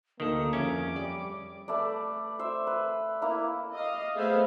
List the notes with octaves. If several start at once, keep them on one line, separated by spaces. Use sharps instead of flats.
D2 D#3 A#3 A4 D#6
F2 C#4 G#4 E5 D6
G3 D5
A3 B4 D5
C5 E5
B4
A#3 E4 A#5
D#5 F5
A3 B3 G#4 C5 E5 F5